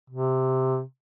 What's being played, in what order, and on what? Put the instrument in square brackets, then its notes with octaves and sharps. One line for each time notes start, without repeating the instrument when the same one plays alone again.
[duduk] C3